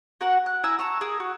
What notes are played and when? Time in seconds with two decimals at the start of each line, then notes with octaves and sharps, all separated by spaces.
0.21 F#4 A#4 F#5
0.46 F#6
0.63 E4 G#5 A#5 E6
0.79 A5 A#5 C#6 E6
1.01 G#4 A#4
1.20 F#4